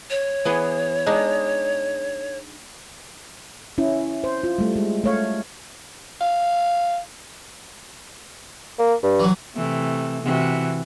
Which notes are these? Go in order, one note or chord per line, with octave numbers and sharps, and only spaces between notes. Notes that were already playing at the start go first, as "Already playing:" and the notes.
C#5
E3 B3 G#4
G#3 D4 D#4
C#4 E4
C5
F4
G3 A3
G#3
A3 C#5 F5
F5
A#3
G2
E3 F#3
C3 E3 A3
C3 E3 F#4